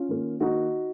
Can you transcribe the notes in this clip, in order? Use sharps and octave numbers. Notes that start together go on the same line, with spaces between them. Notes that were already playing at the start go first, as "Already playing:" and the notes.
Already playing: C#4 F4
D#3 A#3
D#3 A#3 D#4 F#4